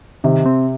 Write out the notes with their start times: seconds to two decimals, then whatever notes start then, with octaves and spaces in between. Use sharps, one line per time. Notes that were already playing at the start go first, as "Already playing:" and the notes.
0.24 C3 D#3
0.46 C4